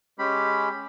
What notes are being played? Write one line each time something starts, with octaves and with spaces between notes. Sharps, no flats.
G#3 C#4 G4 B5